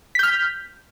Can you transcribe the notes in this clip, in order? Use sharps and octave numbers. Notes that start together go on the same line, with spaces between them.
F6 G6 B6